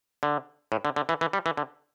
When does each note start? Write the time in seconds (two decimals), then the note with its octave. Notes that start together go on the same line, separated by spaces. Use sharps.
0.23 D3
0.72 A2
0.85 D3
0.96 D3
1.09 E3
1.21 E3
1.33 G3
1.46 E3
1.57 D3